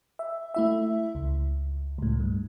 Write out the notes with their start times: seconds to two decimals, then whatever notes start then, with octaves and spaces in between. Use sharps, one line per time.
0.19 E5
0.54 A3 E4 E5
1.15 C#2
1.98 C#2 A2
2.20 G2